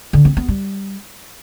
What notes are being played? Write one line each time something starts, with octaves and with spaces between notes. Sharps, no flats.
D3
C4
B3
G3